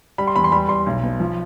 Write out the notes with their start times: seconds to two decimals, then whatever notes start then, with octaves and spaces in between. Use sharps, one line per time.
0.18 G3 B5
0.27 C6
0.36 E2 B5
0.44 C6
0.52 G3 B5
0.69 G3 C6
0.86 B1
1.03 B2
1.20 F3